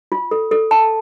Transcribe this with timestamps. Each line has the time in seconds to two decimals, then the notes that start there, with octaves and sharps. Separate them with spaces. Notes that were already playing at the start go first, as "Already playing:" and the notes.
0.12 F4
0.31 A4
0.51 A4
0.71 A5